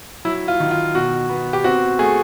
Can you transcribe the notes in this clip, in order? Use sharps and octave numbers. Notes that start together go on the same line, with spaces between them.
F#3 E4
F4
D#3
F4
B2 F#4
B3
G4
C4 F#4
A3 G#4